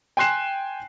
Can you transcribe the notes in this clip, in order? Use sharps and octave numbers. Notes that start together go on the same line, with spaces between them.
G5 G#5 C6 F#6 C7 E7